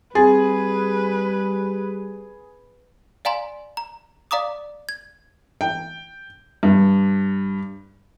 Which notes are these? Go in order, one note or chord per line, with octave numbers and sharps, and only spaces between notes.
G3 C4 G#4 B4 G#5 A6
D5 F5 G#5 A#5 C6
A#5
D5 F5 A#5 D6 D#6
G#6
G5
G2